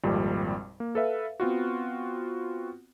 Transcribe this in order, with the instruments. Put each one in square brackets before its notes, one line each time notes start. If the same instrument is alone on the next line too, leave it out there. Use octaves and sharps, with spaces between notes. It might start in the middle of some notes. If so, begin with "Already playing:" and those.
[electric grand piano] G#1 F2 A#2 G3
A#3
A4 B4 E5 F5
B3 C4 F4 F#4